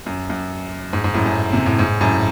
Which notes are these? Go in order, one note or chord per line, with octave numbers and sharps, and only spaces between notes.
F#2
F#2
G#2
G#2
F#2 A2
F#2
C3
A2
G#2
F#2 A2